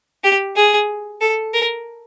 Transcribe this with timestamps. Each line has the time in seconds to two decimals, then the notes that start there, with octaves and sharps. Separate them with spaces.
0.24 G4
0.56 G#4
1.21 A4
1.54 A#4